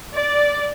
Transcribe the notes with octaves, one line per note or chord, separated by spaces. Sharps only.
D5